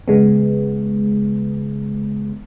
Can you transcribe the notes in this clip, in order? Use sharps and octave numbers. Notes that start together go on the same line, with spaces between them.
C#3 G#3 B3